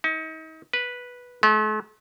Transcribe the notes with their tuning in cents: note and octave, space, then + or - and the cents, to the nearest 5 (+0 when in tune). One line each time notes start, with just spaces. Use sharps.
D#4 +35
B4 -10
A3 -45